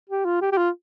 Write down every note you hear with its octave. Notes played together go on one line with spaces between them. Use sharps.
G4
F4
G4
G4
F4